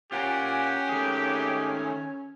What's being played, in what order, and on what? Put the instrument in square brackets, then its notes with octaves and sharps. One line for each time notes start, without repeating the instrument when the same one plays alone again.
[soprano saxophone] C#4 [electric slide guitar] F4 A#4 [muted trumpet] G4 [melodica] F#5 G#5
[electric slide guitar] D#3 G#4 [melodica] A3